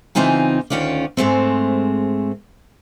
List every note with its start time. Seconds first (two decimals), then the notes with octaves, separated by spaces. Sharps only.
0.15 C#3 E3 C4 D#4 F4 G#5
0.70 D2 D#3 C#4 F4 D5
1.17 G#2 G#3 A3 C4